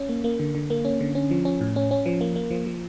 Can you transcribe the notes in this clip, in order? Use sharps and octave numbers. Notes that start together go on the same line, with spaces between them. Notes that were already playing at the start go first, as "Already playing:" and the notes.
Already playing: C#4
A#3
A#3
D3
D3
A#3
C#4
D3
C#4
F3
C#4
A2
C#4
C#4
F3
A#3
A#3
F3
F3